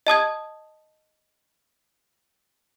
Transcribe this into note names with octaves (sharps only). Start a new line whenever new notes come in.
D#5 A5 D#6 G#6